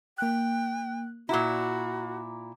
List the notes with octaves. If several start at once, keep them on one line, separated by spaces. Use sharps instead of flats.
A#3 G5 F#6
A#2 E4 F#4 A#5 D6